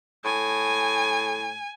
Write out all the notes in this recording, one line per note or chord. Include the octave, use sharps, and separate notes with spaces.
A2 G#5